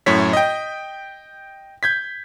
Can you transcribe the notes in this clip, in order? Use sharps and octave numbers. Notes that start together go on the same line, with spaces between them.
F#2 A2 C#5 B6
D#5 G5
G6 G#6 B6